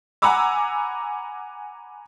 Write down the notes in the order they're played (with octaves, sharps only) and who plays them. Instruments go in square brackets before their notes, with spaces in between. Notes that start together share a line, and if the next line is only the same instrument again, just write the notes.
[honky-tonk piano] F#5 G#5 A#5 B5 D6 E6